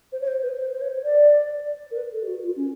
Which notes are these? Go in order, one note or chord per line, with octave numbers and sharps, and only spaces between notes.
C5
C#5
C5
B4
C5
C5
C#5
D5
A#4
B4
A4
G4
F#4
F4
C#4